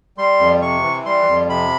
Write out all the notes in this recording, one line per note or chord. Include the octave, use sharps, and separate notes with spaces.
G3 C6
F2
C3 C#6
E3
G3 C6
F2
C3 B5